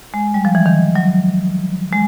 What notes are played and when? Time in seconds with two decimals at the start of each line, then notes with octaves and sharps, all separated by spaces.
0.14 G#3
0.34 G3
0.45 F3
0.55 E3
0.66 D#3
0.95 F#3
1.93 G#3